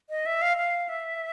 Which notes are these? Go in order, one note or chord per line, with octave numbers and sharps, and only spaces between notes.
D#5
E5
F5
F5
E5